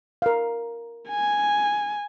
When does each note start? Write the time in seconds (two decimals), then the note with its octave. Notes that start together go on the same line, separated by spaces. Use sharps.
0.22 A#4 F5
1.10 G#5